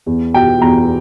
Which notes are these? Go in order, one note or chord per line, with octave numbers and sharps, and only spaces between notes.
E2
B2 G5
E2 A#5